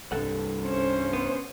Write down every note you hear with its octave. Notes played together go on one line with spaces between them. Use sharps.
C2 G2 A4 F#5
C#4 C5
B3